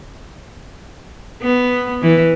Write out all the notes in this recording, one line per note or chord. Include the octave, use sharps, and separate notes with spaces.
B3
E3